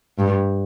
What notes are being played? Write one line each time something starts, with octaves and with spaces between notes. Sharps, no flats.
G2